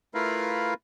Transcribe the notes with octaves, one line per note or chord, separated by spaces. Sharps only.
A3 E4 F4 A#4 B4 F5